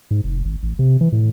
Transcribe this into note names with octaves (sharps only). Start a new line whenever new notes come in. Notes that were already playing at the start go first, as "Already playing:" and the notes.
G#2
F1
G#1
A1
C3
E3
A2